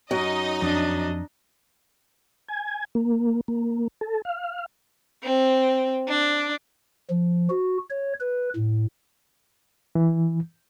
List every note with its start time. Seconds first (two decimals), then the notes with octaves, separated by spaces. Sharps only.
0.11 F#2 D#4 D#5
0.62 F2 D4
2.48 G#5
2.95 A#3
3.48 A#3
4.01 A4
4.25 F5
5.23 C4
6.08 D4
7.10 F3
7.50 F#4
7.90 C#5
8.20 B4
8.56 A2
9.95 E3